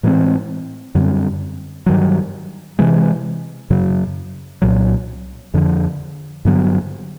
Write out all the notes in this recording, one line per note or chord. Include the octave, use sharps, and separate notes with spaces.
A2 E3 G#3 C4
F#2 D3 G3 C4
G2 D#3 F#3
C3 E3 G#3
F#2 C#3 F#3
C2 A#2 F#3
F2 D3 F3
G2 D3 F#3 B3